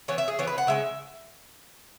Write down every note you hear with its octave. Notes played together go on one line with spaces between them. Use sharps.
E3 B3 C#5
E5
G#4
E3 B3 C#5
B4
F#5
C#3 G#3 C#4 E5